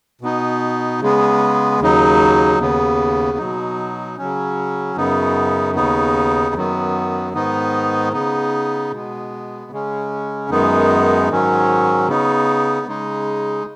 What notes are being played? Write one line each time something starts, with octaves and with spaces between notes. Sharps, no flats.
B2 B3 D#4
C#3 G#3 B3
D#2 C#3 F#3 D#4
D#2 C#3 B3
B2 F#3 D#4
C#3 F#3 C#4
F#2 C#3 B3 D#4
D#2 C#3 B3 D#4
F#2 D#3 F#3 B3
G#2 D#3 B3 D#4
C#3 B3 D#4
B2 G#3 B3
C#3 G#3 C#4
F#2 D#3 G#3 B3 D#4
G#2 D#3 F#3 C#4
C#3 B3 D#4
C#3 G#3 D#4